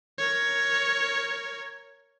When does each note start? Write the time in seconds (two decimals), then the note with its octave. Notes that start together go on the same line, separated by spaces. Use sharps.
0.18 A#4 C#5